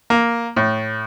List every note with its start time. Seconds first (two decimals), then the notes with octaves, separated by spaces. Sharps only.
0.10 A#3
0.56 A2